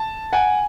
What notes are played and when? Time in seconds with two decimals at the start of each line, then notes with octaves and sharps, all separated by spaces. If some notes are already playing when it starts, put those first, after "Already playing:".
Already playing: A5
0.33 F#5 G#5